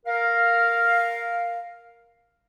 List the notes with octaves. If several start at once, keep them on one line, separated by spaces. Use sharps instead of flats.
A#4 F5